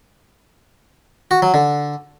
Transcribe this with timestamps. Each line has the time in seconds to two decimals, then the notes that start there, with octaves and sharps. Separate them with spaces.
1.31 F#4
1.42 F#3
1.54 D3